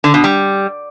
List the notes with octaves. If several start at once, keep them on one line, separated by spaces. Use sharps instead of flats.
D3
B2
G3